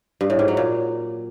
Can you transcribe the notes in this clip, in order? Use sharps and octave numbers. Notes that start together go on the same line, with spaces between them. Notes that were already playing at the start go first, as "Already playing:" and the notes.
G2
A2
G#2
F#3
A#2